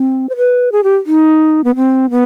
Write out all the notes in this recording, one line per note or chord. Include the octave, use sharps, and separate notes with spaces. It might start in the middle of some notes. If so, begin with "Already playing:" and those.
Already playing: C4
C5
B4
G#4
G4
D#4
B3
C4
B3